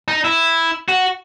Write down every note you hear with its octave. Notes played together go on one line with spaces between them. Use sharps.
D#4
E4
F#4